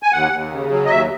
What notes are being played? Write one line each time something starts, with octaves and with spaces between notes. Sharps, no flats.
G#5
D#2 F#5
D#2
C#3
F#3
D#5
D#2 E5